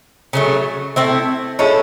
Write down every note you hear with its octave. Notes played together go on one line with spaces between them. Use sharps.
C#3 F#3 A3
A3 C4 E4
G#3 C#4 E4 A4